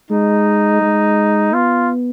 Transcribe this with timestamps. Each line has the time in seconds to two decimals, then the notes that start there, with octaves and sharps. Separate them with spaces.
0.10 G#3 D#4
0.82 G#3
1.53 B3 F4